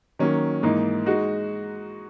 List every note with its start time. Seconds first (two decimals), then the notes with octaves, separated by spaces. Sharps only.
0.19 D#3 F#3 A#3 C#4
0.62 G#2 E3 A#3 D#4
1.06 G#3 D#4 F#4